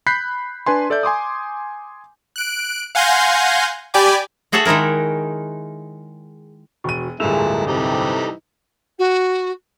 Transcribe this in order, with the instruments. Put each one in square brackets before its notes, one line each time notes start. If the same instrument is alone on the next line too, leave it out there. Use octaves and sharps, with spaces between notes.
[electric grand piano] B5 F#6 G6 B6 C7
D4 B4 G#5 C6
A4 D5 E5 G6
G#5 C6 D6 D#6
[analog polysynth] F#6 D7
F5 F#5 G#5 C6 G6 A#6
G4 D5 G5 G#5 B5 D6
[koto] A3 F#4 G#4 A4 C#5 F#5
D#3 G#3 D#4 E4 A#4
[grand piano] E1 D#7 [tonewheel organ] F#4
[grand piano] D1 G2 [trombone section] A#2 G#3 [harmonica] E4 [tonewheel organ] A4 A5 A#5
[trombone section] C3 [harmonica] E3 G3 D#4
[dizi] F#4